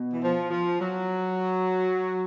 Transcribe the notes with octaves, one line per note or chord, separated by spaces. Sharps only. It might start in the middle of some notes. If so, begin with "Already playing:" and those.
Already playing: B2
E3
F3
F3
F#3